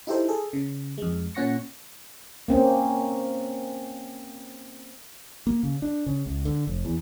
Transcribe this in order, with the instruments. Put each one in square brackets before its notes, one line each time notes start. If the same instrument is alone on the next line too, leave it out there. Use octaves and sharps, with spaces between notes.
[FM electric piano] D#4 E4 G4 A4 C5
G#4 A4
C#3
F2 G#3
A#2 C#4 F#5 C#6 A#6 C#7
[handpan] A#3 C4 C#4
[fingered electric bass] A#3
C#3
D4
C#3
C#2
D3
F1
E2